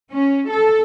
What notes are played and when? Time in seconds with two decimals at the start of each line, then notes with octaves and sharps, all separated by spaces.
0.12 C#4
0.50 A4